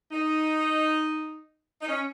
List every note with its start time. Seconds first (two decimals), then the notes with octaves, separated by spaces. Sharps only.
0.11 D#4
1.82 D#4
1.89 C#4